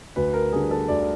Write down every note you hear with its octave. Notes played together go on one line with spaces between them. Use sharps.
D2 B4
A#4
D3 G3 G#4
A4
D2 D5